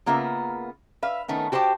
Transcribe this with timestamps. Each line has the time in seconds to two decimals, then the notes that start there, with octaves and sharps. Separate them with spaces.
0.06 C#3 A#3 B3 F4 A#4 E5
1.02 B4 E5 F5
1.28 D#3 A3 B3 C#4
1.52 F#4 G4 C5 G5 A5